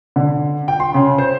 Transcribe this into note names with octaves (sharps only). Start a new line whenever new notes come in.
D3
G5
C6
C#3
C5